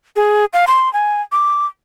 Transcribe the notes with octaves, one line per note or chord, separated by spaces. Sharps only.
G#4
F5
C6
G#5
D6